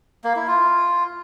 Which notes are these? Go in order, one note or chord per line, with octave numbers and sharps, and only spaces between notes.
A#3
E4
F4